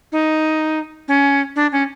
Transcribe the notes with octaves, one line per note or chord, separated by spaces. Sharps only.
D#4
C#4
D4
C#4